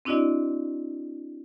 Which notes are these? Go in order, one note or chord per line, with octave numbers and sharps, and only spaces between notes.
C4 D4 E4 F#4 D5 D#5